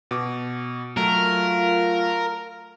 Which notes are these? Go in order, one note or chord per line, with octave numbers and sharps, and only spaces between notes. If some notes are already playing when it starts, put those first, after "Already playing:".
B2 D6
F#3 A3 F4 A#4